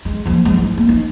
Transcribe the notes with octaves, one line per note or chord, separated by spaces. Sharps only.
G#3
D#2 F3
G#3
E4
A#3
D#4